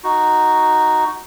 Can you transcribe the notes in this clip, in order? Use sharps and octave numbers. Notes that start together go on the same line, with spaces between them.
D#4 F#4